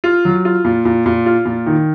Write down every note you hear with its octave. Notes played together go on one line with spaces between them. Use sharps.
F4
F#3
F4
A#2
A#2
A#2
F4
A#2
D#3